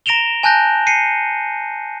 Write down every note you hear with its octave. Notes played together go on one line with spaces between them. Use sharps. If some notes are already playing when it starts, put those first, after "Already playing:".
A#5 A#6 D7 E7 F7 G7
G#5 A5 F#6 G6 A#6
C7 C#7 D#7